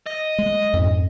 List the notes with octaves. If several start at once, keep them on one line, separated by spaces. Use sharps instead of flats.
D#5
G#3
F2 G#2